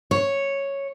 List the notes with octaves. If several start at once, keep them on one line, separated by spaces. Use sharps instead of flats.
C#5